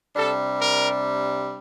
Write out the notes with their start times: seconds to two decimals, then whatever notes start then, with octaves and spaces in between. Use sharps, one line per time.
0.16 C3 G3 D4 A4
0.62 A#4